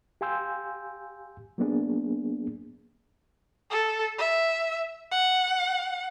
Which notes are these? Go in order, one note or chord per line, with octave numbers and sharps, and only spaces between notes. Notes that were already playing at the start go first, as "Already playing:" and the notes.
G4 F5 G#5 C6 E6 G6
F#3 A#3 B3 D4 G#4
A4
E5
F#5